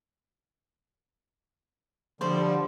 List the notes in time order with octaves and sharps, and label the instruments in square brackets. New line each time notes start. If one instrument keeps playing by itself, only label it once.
[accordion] D3 F3 G3 [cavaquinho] C5 D5